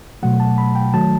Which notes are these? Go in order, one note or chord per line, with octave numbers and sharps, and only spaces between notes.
B2 F#3 A3 F#5
A5
B5
G5
D#3 F#3 A3 A5